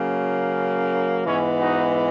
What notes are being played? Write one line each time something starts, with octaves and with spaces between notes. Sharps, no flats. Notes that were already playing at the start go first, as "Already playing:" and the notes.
Already playing: C#3 F#3 A#3
C#4
G#2 E3 G#3 B3 C#4 E4
D#4 F#4